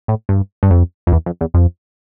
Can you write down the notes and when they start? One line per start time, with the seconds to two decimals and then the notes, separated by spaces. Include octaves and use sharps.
0.08 A2
0.29 G2
0.63 G2
0.71 F2
1.07 F2
1.12 E2
1.26 F2
1.41 E2
1.54 F2